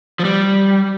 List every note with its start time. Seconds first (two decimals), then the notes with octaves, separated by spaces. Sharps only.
0.19 F3
0.25 G3